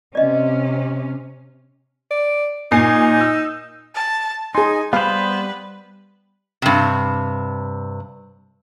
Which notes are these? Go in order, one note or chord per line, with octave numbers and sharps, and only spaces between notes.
C3 C#4 D5 D#5
D5
A#2 D#4 G#5 C7
E6
A5
D#4 G#4 G#5 C6
G3 B3 B4 C5 F5 B5
G2 C3